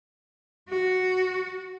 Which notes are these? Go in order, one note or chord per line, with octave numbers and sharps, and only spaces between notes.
F#4